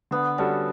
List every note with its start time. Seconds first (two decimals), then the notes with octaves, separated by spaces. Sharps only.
0.11 D3 B3
0.38 G3 C#4 D4 F#4 A4